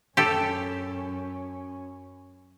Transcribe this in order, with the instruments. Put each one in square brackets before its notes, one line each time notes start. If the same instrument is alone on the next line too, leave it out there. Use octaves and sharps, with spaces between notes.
[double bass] F#2 C#4 [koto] G4 A4